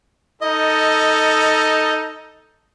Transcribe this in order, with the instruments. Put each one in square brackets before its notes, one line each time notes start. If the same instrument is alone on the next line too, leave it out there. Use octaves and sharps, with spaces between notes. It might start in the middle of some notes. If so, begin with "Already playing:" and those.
[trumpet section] D#4 A4 [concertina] D#5